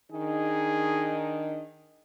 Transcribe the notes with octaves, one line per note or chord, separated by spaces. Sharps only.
D#3 D4 D#4 G#4